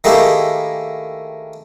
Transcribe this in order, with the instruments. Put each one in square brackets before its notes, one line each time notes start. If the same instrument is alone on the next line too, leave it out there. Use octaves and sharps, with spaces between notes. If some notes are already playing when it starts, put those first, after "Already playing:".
[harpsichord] D#3 A3 A#3 E4 G4 G#4